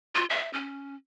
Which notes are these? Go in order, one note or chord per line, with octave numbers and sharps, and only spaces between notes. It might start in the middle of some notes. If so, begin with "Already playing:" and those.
F4
E5
C#4